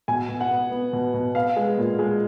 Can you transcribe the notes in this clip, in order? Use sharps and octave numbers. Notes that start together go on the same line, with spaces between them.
B2 G#5
B2
F#5
B3
B3
B2
B2
B3 F5
G#3
A#2
G#3